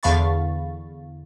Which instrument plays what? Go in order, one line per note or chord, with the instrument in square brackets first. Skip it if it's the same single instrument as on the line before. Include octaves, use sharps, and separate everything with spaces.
[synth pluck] E2 D3 F5 B5 C#6 A6